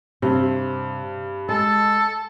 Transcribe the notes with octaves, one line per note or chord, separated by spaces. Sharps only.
G2 C3
G#3 A4